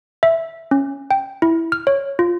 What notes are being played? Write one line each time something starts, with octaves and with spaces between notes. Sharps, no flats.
E5
C#4
G5
E4
F6
C#5
F4